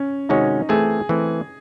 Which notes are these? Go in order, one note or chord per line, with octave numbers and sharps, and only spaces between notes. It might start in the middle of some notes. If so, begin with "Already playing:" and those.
Already playing: C#4
C3 D#3 G#3 C#4 D#4 F#4
E3 A3 C4 G#4
E3 A3 C4